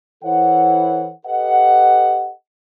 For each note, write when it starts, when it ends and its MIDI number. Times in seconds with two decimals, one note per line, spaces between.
0.24 1.10 52
0.24 1.10 64
0.24 1.10 69
0.24 1.10 72
0.24 1.10 73
0.24 1.10 78
1.26 2.31 67
1.26 2.31 69
1.26 2.31 71
1.26 2.31 75
1.26 2.31 78